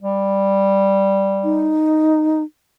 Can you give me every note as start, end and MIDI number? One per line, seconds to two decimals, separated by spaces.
0.02 1.78 55
1.44 2.43 63